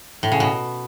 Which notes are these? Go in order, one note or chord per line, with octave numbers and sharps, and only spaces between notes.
A2
C#3
B2